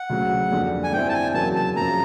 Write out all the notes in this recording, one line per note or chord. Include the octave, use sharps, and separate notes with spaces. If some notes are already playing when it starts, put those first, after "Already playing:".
Already playing: F#5
D2 C#3 F#3
F2 D3 G3
G#5
G2 D3 G3 C4 E4 G5
A5
G#5
E2 C#3 F#3 A#3 A5
A5
F#2 C#3 F3 A#5